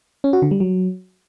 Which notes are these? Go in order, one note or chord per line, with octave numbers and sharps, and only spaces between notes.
C#4
F#4
D3
G3
F#3